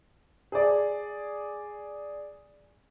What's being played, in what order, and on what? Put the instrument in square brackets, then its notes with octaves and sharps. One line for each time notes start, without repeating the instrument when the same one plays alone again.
[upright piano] G#4 D5